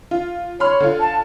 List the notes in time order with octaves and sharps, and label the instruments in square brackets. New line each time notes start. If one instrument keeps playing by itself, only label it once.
[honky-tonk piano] F4
[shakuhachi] C#5 [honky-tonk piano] B5 C6 F6
[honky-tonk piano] D3 F4
[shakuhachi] A5